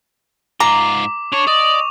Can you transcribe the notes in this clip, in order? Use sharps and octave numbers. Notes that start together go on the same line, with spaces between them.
G#2 F4 A#5 D6
D4 C#5 A5 C#6 F7
D5 D#5